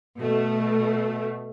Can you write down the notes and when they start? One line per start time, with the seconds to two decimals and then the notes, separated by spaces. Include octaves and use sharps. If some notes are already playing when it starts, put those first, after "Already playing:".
0.18 B2 A3